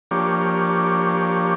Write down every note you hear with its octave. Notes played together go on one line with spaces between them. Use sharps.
F3 A#3 D4 G4 C#5